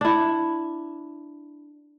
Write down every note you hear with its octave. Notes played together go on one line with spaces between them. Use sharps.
D4 E4